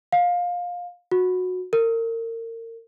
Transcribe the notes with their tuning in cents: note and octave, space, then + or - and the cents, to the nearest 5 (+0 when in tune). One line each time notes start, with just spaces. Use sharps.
F5 +20
F#4 -15
A#4 -35